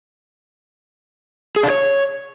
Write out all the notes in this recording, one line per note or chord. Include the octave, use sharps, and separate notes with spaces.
G#4
D4
C#5